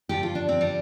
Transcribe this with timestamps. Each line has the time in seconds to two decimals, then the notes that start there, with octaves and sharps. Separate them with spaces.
0.09 G2 D3 F3 G4
0.23 F4
0.35 D4
0.49 C4
0.61 G3